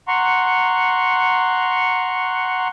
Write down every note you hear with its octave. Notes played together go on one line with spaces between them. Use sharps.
F#5 A#5 C6 C#6